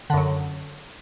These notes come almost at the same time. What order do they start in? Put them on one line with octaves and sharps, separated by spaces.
D3 F#2 F#3